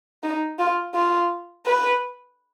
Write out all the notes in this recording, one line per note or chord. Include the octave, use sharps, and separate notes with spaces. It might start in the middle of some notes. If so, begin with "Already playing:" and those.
D#4
F4
F4
B4